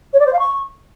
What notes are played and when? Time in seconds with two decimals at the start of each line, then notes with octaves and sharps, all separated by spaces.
0.13 C#5
0.19 D5
0.26 C5
0.32 F5
0.39 C#6